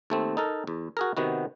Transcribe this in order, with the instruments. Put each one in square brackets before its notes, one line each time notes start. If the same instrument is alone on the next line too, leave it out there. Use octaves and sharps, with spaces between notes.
[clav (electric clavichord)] D#2 A3 C4
D#4 A4 A#4
E2
F#4 G#4 A#4
C3 D#3 B3 F#4